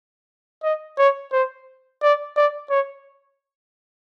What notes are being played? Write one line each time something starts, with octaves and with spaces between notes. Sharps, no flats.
D#5
C#5
C5
D5
D5
C#5